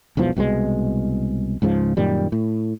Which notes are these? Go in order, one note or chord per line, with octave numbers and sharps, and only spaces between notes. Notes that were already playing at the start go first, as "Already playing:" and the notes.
E1 B1 E2 F3
C2 B2 D3 G#3
C#2 G#2 C#3 F3
F#2 A#2 D#3 G3
A2